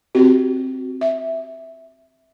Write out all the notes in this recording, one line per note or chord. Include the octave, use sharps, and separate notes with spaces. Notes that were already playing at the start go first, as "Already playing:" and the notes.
C4 F#4 G4
E5